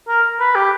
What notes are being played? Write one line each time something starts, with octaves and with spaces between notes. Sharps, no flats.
A#4
B4
G4